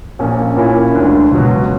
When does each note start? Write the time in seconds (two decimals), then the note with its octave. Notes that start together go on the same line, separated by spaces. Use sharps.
0.19 A#1 A#2 A#3 C#4
0.57 A#2 A#3 C#4 E4
0.94 E1 D2 D3
1.32 C#2 B2 F#3